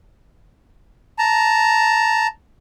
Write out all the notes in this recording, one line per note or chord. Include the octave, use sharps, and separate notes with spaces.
A5 A#5